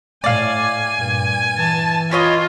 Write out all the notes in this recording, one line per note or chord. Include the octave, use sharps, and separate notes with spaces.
A2 D5 F5 G#5
G2 A#2
E3 A5
F4 B4 C#5 D#5